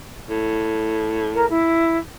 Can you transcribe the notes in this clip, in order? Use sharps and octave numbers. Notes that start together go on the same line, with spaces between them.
A2
A#4
E4